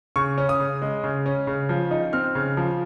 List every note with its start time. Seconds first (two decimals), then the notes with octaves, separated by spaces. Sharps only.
0.16 C#3 C#6
0.38 C#4
0.49 D#6
0.60 C#3
0.82 G#3
1.04 C#3
1.26 C#4
1.47 C#3
1.69 F3
1.91 D#4
2.13 C4 F6
2.35 C#3
2.57 F3